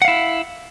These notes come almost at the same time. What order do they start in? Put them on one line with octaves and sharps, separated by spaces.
F#5 F5 E4